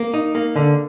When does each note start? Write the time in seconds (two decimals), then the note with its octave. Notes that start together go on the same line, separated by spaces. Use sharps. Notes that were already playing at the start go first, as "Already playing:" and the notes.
Already playing: A#3
0.14 D#4
0.35 A#3
0.56 D3